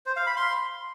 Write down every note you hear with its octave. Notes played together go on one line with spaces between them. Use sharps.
C5
F5
B5
C6